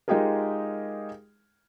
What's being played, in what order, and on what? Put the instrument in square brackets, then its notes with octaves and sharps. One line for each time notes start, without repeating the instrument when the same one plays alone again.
[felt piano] G#3 D#4 F4 G4 G#4 A#4